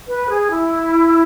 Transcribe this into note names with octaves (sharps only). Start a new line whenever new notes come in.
B4
G#4
E4